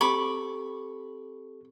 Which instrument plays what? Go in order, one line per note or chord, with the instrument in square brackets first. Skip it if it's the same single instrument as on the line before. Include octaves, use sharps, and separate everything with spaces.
[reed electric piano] C4 G4 A4 [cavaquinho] B5 C#6 D6